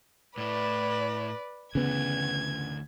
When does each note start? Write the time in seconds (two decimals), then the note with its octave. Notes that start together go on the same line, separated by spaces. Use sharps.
0.38 A2 E4 B4 D5
1.75 D2 C#3 E3 B3 G#6